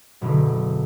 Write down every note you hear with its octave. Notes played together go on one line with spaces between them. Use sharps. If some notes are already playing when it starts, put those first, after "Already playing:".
F#1 B2 D3